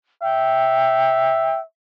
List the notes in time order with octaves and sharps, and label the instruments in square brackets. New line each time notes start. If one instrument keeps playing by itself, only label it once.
[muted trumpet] E5 [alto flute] G5